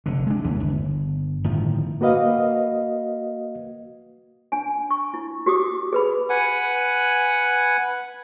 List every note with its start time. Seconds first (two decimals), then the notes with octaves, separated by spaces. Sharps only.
0.06 F1 D3
0.27 G#3 D4
0.44 D#2 C#3 E3
0.60 G1
1.44 G1 A2 D#3 F3
2.01 A#3 F#4 B4 D#5 F5
4.52 D4 G#5
4.91 C#6
5.14 E4
5.46 F#4 G4 D6 D#6
5.93 G#4 B4 B5
6.30 B4 F#5 G#5